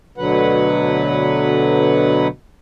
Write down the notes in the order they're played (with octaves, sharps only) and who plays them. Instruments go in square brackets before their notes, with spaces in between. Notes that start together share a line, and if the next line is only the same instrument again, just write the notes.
[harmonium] D2 B2 D3 F#3 B4 F#5